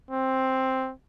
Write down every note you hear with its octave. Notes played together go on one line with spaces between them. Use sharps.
C4